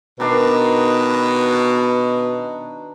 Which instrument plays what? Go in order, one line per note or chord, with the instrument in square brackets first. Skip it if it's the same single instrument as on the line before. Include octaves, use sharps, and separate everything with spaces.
[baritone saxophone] B2 [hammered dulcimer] D#3 D4 [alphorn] B4 [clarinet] D#5